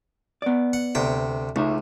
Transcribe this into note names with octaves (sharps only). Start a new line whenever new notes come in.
B3 D5
F#5
D2 C3 G5
C#2 A3 D#4 E5